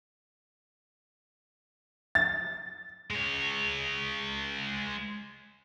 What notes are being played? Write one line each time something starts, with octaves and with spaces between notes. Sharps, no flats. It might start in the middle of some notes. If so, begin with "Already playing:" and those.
A6
G#3 C#5